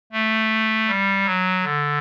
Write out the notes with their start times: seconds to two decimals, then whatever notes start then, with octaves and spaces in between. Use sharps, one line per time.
0.12 A3
0.88 G3
1.26 F#3
1.63 D3